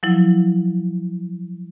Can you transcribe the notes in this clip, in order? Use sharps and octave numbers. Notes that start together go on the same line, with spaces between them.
F3 F#3 E4